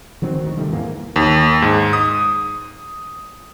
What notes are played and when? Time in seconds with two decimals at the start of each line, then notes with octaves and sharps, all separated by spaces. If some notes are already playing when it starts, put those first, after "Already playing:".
0.22 D#3 F#3 C4
0.41 D2 D#3
0.57 C3 D#3 G3 A3
0.70 E2 G#2 E3 A#3
1.16 D#2
1.62 G#2
1.93 D#6